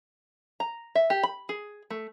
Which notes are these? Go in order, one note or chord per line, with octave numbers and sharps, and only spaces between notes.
A#5
E5
G4
B5
G#4
A3